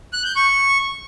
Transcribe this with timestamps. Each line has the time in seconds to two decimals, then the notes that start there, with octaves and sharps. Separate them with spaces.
0.13 F#6
0.24 G6
0.36 C#6